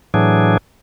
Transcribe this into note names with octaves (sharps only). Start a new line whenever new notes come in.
A2 E3 F#3 D4 G#4